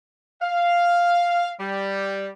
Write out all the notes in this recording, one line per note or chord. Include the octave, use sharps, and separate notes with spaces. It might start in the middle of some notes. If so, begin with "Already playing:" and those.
F5
G3